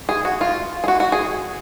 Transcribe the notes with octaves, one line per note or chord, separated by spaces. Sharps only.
G#4
F#4
F4
G#4
F#4
F#4
G#4